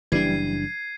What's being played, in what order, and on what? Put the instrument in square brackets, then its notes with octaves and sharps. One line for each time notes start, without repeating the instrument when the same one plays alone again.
[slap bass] F#1 D4 [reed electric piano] E3 G3 [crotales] G#6 C7 D#7